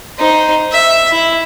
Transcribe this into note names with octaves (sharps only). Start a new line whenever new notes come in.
D#4 C5
E5
E4